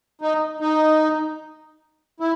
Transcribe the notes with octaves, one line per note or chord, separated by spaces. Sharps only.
D#4
D#4
E4